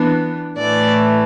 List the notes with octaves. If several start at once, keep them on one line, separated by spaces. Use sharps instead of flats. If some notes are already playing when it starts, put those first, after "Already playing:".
Already playing: E3 B3 D4
A2 E3 A3 D5